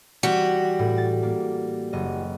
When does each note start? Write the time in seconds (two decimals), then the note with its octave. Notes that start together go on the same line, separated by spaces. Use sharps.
0.23 E3 G3 C4 F#4
0.79 A2
0.98 A6
1.23 A#3
1.93 F#1 D#5